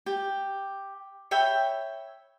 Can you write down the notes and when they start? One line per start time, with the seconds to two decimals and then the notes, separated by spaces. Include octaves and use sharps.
0.06 G4
1.31 C#5 E5 G5 B5